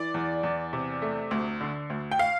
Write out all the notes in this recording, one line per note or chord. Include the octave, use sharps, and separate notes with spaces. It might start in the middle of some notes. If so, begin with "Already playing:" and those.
Already playing: E3 D5
E2
E2
C3
A3
D2
D3
D2
G5
F5